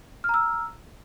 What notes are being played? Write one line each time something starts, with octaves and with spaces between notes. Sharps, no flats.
A#5 E6 F6